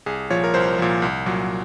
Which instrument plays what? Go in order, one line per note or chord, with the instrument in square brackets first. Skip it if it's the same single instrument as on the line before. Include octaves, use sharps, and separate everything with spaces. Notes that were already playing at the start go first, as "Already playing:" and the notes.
[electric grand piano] C2 G#4
A#2 F3 C#5
A#4
C2 C5
A#2 F3
C2
A#2 F#3